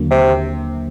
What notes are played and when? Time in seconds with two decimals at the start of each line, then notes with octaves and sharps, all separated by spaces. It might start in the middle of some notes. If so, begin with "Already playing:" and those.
Already playing: D#2 D3 F#3 A#3
0.11 C3